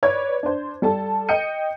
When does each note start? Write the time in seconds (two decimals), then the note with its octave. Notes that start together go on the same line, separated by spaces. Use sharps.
0.03 B4 C#5 D5 G#6
0.43 D4 C5
0.82 G3 A4 A5
1.29 D#5 G5 G6 C#7 D#7